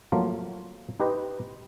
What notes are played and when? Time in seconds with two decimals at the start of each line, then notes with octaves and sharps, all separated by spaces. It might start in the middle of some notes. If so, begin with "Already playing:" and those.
0.12 F3 F#3 A3 A#3 F4
1.00 D#4 G4 B4 C5 D#5